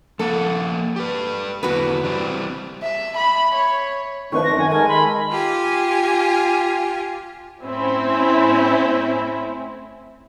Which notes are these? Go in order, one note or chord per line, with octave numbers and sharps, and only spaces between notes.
F3 A#3 A4 F#5
G4 B4
E2 D3 E3 F#4 B4
E3 G3 C4
E5
B5
C#5
D#3 F3 A3 C4 D4 B4 C#6
F#2 A#6
D#3 F#5 G#5
G#3 A4 A#4 G#5
B5 C6
F4 G4 G#5
A2 C4 C#4 E4